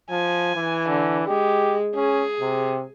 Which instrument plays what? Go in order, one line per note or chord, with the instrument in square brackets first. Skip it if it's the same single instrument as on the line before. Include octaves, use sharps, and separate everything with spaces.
[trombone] F3 [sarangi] G#5
[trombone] E3
[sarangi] D3
[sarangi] G#3 [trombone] G4
[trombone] C#4 [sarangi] G#4
[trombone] C3